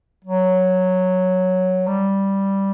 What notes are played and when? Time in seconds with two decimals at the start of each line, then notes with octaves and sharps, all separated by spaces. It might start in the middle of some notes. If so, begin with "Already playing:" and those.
0.25 F#3
1.87 G3